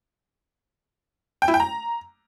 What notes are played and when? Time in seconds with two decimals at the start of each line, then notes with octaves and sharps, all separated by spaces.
1.42 G5
1.48 E4
1.54 G5
1.60 A#5